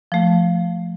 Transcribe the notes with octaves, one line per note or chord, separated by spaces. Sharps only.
F3 A3